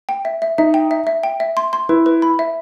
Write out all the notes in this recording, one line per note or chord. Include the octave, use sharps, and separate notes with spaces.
G5
E5
E5
D#4 E5
G5
E5
E5
G5
E5
C6
C6
E4 B4
B4
B5
E5